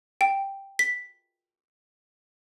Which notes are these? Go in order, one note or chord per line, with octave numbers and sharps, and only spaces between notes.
G5
B6